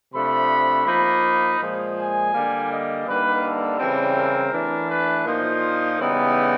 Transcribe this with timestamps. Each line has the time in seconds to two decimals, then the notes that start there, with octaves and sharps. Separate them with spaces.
0.14 C3 F3 A3 D4 B5
0.86 F3 A#3 D#4 B5
1.60 A#2 F3 G#3
1.97 G#5
2.34 D3 G3 A#3
2.70 D#5
3.06 G2 D3 G3 A#3 D#4 B4
3.44 A4
3.79 C#3 E3 G3 C4
4.16 A#4
4.52 E3 A3 D4
4.89 B4
5.27 A#2 F3 A#3 D#4 C5
5.99 C#3 E3 G3 B3 D#4